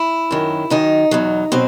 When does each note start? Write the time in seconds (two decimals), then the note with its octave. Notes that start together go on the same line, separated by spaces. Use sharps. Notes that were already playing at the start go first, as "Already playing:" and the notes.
Already playing: E4
0.31 F#2 D#3 F#3
0.70 F#2 D#3 F#3 D#4
1.11 E2 B2 F#3
1.52 B2 F#3 C4